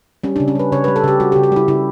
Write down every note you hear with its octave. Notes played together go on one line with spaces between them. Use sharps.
G3 C#4
C#3 D4
C#4
G3 B4
C#3 C#5
G3 B4
A4
C#3 G4
G3 F#4
G4
C#3
G4
G3 E4
C#3 E4